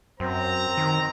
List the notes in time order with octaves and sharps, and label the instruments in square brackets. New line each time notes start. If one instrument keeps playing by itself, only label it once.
[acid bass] F#2 [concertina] C4 [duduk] C5 [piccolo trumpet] A#5
[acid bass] D#3